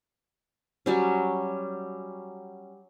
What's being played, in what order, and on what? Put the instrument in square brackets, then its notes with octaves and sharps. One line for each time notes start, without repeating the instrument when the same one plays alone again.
[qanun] F#3 G3 C#4